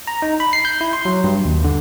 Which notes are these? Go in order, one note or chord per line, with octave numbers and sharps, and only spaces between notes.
A#5
D#4
B5
C7
G6
E4
C6
F#3
G2
D#2
D3